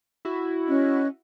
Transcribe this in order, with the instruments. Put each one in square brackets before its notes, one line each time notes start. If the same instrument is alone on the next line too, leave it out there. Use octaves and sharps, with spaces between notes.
[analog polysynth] E4 F#4
[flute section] C#4 D#5 F#6